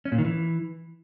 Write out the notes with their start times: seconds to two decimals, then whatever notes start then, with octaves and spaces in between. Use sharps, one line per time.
0.05 C#4
0.12 A#2
0.18 D#3
0.25 E3